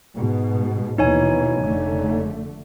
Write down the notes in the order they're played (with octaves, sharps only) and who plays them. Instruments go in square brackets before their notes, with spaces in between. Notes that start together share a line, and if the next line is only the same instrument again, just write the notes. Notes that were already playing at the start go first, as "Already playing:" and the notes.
[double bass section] G#2 B2
[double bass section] D#2 B2 E3 [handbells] D#4 C#5 G#5
[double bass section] F1 D3 A3